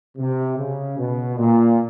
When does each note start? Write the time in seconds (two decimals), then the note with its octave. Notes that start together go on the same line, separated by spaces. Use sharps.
0.18 C3
0.58 C#3
0.98 B2
1.37 A#2